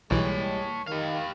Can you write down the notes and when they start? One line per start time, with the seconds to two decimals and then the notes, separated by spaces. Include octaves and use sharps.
0.11 B1 E3 G3 G#3 C#5 A5
0.87 D#3 G4 F5